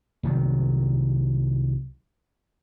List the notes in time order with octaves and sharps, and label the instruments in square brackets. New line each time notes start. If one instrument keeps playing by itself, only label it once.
[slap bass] C2 D#3 F#3